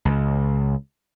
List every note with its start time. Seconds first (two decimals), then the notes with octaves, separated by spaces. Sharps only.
0.05 C#2